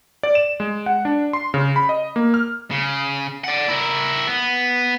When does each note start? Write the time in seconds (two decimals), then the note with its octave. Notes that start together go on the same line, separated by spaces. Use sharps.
0.23 D5
0.35 E7
0.60 G#3
0.86 F#5
1.05 D4
1.33 C6
1.54 C#3
1.76 B5
1.89 D#5
2.16 A#3
2.34 F6
2.71 C#3
3.44 D5 F#5
3.68 E4 A#4
4.27 B3